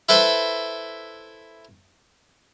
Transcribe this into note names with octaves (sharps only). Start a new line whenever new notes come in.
E4 A4 B4 C5